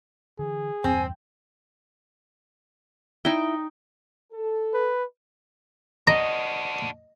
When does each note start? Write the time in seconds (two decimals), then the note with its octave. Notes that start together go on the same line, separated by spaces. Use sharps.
0.39 D3 E3 G#4
0.84 E2 G2 A#2 C4 G#5
3.25 D#4 E4 G5
4.32 A4
4.74 B4
6.07 D4 F#4 D#5 A#5